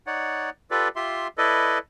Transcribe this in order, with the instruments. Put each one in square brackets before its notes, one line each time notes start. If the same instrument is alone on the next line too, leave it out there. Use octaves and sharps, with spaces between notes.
[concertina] D#4 C#5 D5 F#5
F4 G4 A4 B4 D5
F4 G4 E5 C6
E4 A4 B4 D5 D#5